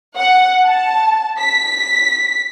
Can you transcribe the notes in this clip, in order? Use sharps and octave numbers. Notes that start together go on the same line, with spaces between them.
F#5
A5
B6